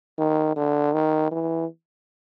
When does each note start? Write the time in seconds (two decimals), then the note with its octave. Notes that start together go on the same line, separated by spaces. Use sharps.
0.18 D#3
0.56 D3
0.93 D#3
1.31 E3